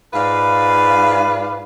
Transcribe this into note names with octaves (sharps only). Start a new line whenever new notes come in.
G#2 F4 B4 D5 F5